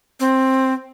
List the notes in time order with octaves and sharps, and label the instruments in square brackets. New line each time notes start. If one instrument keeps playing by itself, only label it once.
[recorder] C4